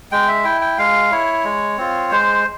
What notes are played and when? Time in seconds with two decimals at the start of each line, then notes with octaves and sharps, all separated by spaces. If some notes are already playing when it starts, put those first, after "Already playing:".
0.12 G#3 G5
0.28 E5
0.44 E4 G5
0.61 G5
0.78 G#3 F5
1.12 E4 C#5
1.44 G#3
1.77 C4 F4
2.11 G#3 C5